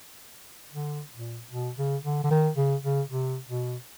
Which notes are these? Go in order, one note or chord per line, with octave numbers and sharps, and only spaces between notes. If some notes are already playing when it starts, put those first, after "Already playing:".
D3
A#2
B2
C#3
D3
D3
D#3
C#3
C#3
C3
B2